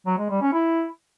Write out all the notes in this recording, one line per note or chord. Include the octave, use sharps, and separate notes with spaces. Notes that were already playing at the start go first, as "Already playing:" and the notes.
F#3
G#3
G3
C#4
E4